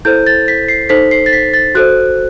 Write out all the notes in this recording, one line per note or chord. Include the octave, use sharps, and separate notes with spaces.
E4 A4 C5 G6
A6
B6
C7
D#4 A4 C5 B6
C7
A6
B6
A6
F#4 A4 C5 F#6